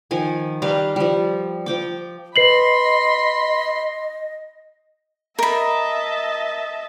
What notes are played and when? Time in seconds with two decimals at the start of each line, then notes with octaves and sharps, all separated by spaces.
0.11 D#3 F3 G#5
0.62 G3 B4 F5 A#5
0.96 F3 G3
1.66 F3 G5 D6
2.36 B4 D#5 B5 C6 C7 F#7
5.39 A#4 D#5 E5 A5 B5